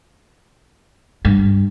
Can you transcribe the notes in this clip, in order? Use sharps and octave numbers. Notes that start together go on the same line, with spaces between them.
G2